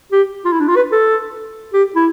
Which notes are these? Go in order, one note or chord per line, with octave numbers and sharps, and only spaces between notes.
G4
F4
E4
D4
F4
B4
A4
G4
E4